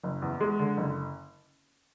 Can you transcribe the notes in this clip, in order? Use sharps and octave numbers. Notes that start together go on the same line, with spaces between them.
F#1
E2
G#3
D3
F#1